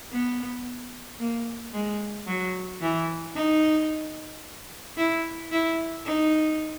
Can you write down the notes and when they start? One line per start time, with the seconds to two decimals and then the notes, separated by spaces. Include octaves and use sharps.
0.12 B3
1.19 A#3
1.73 G#3
2.27 F#3
2.82 E3
3.36 D#4
4.97 E4
5.51 E4
6.06 D#4